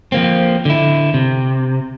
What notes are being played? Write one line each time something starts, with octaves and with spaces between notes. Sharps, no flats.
F3 A#3 C4
D3 E4
C3